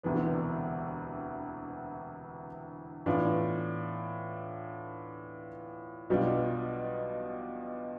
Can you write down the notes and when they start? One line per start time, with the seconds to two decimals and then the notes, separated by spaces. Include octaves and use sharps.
0.03 E1 D2 C3 E3 B3
3.06 A2 E3 B3 D4 F4
6.10 B1 B2 G3 D4 F4